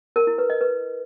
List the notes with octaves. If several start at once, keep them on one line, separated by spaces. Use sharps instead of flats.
A#4
E4
B4
D#5
B4